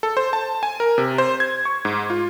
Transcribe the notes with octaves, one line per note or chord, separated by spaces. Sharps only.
A4
C5
A5
G#5
A#4
C3
C5
G#6
C#6
G#2
F4